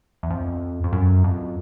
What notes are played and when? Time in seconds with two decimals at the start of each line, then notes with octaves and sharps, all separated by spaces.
0.23 E2
0.30 F2
0.84 F2
0.93 F#2
1.24 F2